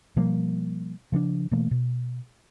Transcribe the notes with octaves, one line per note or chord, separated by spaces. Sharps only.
B2 F3 G3 A#3
C#3 F3 C#4 D4
B2 E3 A3 A#3
B2